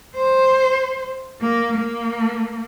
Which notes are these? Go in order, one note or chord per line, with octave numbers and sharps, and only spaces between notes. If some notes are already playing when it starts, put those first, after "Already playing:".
C5
A#3
A#3